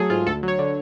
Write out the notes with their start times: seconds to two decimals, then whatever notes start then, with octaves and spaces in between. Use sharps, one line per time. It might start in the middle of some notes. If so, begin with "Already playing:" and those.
Already playing: F#3 A3 G#4 A4
0.10 G#2 F4
0.26 D2 A4
0.43 F#3
0.48 C#5
0.59 D3